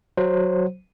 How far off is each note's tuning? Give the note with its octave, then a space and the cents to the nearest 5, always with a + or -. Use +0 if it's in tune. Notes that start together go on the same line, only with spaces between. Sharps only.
F#3 +0 C5 +0